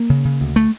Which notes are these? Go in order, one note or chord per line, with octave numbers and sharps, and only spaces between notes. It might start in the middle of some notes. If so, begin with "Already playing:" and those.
Already playing: A#3
C#3
C#3
D2
A3